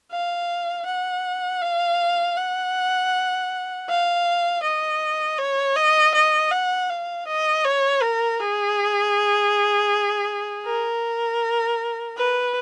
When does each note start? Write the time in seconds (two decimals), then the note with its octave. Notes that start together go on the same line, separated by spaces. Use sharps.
0.11 F5
0.86 F#5
1.61 F5
2.37 F#5
3.88 F5
4.63 D#5
5.38 C#5
5.76 D#5
6.15 D#5
6.51 F#5
6.90 F5
7.27 D#5
7.65 C#5
8.02 A#4
8.40 G#4
10.66 A#4
12.17 B4